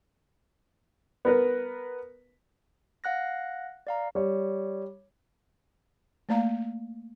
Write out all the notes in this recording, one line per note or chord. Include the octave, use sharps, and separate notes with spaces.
B3 A#4 B4
F5 F#5 F#6 A#6
D5 F5 A#5
G3 C#5
A3 A#3 D5 F5 A#5